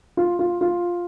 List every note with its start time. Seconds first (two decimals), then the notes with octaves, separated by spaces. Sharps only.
0.17 F4
0.39 F4
0.61 F4